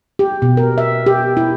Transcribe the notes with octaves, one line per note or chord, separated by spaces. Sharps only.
G4
B2
A#4
E5
G4
E4